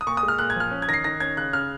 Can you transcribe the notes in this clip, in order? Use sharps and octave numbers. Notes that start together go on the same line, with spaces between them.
D#6
A#2 C#6
D#6
G#3
F6
A#2 F#6
G#6
F3 F6
C#4
G#6
D#3 A#6
C7
D#3 A#6
C#4 G#6
C#3 F#6
C#3 F6